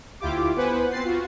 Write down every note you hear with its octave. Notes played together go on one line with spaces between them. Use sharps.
D2 E4 F4 G4 D6
B3 B4 C5 F#5 G#5
C4 A6 C7
F4 F#4